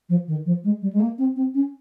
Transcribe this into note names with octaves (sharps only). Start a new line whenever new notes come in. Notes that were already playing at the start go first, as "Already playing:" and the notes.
F3
D#3
F3
G#3
G3
G#3
A#3
C4
C4
C#4